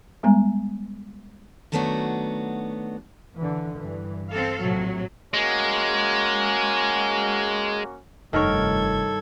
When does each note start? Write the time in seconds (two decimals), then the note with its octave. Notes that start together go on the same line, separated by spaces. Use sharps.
0.23 G3 G#3 B3 G#5 A#5
1.72 D#3 F#3 A3 B3 D4 F#4
3.37 D3 E3
3.76 G2 E3
4.29 C4 A4 F5
4.60 A#1 A2 C3 F#3
5.34 G#3 A#3 C#4 F#4
8.33 F1 G2 C3 D#3 A4 A#4 C#5 G#6